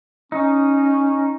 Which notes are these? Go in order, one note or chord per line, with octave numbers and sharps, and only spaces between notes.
C#4 D#4